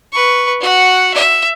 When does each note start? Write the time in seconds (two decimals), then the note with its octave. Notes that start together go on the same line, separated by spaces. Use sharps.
0.13 B4 C#6
0.61 F#4 F#5
1.15 E5